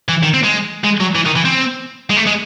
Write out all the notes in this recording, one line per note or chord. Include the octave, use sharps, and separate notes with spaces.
E3
D#3
C4
G#3
G#3
F#3
E3
D#3
E3
C4
G#3
A3
G#3